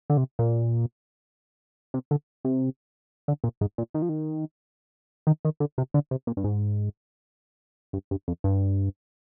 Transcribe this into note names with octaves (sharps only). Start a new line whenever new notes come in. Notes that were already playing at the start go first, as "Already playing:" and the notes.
D3
C3
A#2
C3
D3
C3
D3
A#2
G#2
A#2
D#3
F3
D#3
D#3
D#3
D3
C3
D3
C3
A#2
G2
G#2
G2
G2
F2
G2